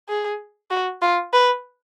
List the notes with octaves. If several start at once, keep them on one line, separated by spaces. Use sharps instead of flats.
G#4
F#4
F4
B4